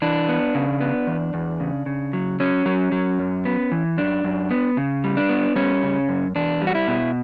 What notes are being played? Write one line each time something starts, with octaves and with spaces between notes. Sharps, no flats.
E3 D4
B3
C#3
B3
E2
E2
C#3
C#3
F#3
F#3 C#4
F#3
F#3
F#2
B3
E3
F#2 D4
F#2
B3
C#3
G3
D4
B3
G3 C#4
C#3
F#2
E2 D4
G3
F#4
E4
B2